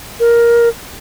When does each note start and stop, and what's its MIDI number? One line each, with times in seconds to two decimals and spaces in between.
0.20 0.69 70